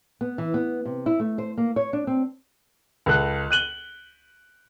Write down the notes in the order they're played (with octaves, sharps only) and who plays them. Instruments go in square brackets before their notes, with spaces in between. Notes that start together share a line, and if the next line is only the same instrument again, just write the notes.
[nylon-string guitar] B3
E3
B3
C3
E4
A3
C5
A#3
C#5
D4
C4
[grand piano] C#2 A4 F#6
F#6 D#7 F#7 G7